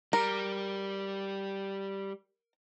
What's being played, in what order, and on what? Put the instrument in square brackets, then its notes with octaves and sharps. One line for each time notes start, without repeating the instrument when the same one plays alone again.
[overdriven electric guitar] G3 [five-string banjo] A#4